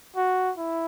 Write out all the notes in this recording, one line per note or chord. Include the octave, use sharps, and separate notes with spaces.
F#4
E4